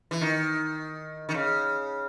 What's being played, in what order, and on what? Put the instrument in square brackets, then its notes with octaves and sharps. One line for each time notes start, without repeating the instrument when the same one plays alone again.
[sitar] E3
D#3
D#3
C#3